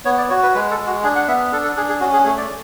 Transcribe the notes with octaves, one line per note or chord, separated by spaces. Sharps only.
B3 C#5
D5
F#4 C#5
B4
G#3 B4
A4
G#3
F#4
D4 G#4
F#5
B3 E5
D4 A4
A4
D4 G#4
G#4
C#4 F#4
G#4
A3 G#4
D5